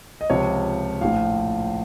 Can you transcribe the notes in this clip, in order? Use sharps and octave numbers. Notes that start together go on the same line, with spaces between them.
D#5
C#2 C3 F3 C#5
A#1 A2 F3 F5